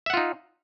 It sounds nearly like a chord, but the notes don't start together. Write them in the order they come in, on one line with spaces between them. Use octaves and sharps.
E5 F#5 F4 D#4